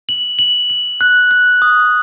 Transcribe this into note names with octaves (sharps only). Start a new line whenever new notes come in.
F#7
F#7
F#7
F#6
F#6
D#6